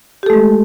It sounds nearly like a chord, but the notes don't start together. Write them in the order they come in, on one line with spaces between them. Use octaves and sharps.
G4 A4 A3 G#3